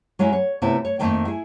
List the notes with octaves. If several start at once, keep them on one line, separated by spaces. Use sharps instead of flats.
F#3 G#3 C#4 E4
C#5
C3 A3 B3 E4 F4
C#5
F2 G#2 D#3 A3 A#3 G5
E4 G#4